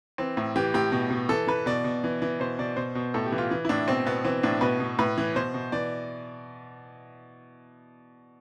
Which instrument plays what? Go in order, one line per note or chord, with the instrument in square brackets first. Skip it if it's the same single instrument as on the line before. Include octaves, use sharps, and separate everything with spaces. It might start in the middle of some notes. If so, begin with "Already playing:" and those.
[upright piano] E3 C4
A2
E3 G4
A2 G4
B2
B2
E3 A4
E3 B4
B2 D5
B2
E3
E3
B2 C5
B2 D5
B2 C5
B2
A2 A4
G4
E3
F4
E3
E4
A2 D4
B2 C4
B2 B3
E3 C4
A2 D4
B2 B4
B2
A2 B4
E3
B2 C5
B2
E3 D5